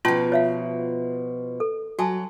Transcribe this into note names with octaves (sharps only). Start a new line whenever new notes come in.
B2 F3 C#4 F4 A5 C6
C#5 E5 F5
A4
F#3 F#4 G#5 A5